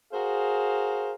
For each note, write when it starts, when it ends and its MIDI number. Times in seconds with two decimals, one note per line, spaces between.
0.13 1.13 66
0.13 1.13 68
0.13 1.13 70
0.13 1.13 72
0.13 1.13 77